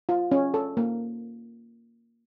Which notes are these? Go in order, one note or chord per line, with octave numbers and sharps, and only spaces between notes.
F4
C#4
A4
A#3